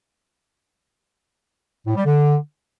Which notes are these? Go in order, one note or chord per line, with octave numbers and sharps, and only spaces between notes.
A2
G3
D3